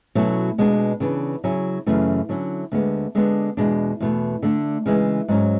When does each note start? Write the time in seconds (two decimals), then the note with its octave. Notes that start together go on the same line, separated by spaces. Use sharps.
0.15 B2 F#3 A3 C#4 E4
0.58 B2 G#3 B3 D4
1.00 C#3 E3 B3 D4
1.44 C#3 F#3 C#4 E4
1.86 F#2 C#3 E3 A3
2.29 D3 F#3 C#4 E4
2.72 D2 D3 G#3 B3
3.15 D3 G#3 B3 D4
3.57 E2 B2 G#3 D4
4.00 E2 B2 A3
4.43 D3 A3 D4
4.86 C#3 E3 G#3
5.28 G#2 F#3 C#4